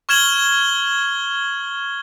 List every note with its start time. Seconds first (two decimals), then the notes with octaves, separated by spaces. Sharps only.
0.09 C#6 F6 G#6 E7 F#7 G7